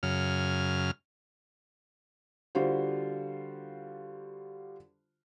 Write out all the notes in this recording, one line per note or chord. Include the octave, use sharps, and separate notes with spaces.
F#2 C#3 F6
D3 G3 F4 F#4 C5